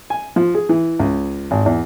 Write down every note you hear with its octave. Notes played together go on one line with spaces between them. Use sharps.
G#5
F3
G#4
E3
C#2
G#1
E2